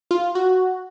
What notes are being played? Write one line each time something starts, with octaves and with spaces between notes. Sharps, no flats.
F4
F#4